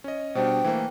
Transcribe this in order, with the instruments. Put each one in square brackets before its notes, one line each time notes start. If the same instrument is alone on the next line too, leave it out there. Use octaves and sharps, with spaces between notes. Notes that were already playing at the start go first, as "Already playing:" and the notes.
[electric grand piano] C#4 D#5
[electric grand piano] B2 G3 D4 [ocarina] C5 [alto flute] G5
[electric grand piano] E3 A3 A#3